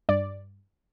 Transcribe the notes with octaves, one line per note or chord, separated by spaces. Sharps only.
G2 D5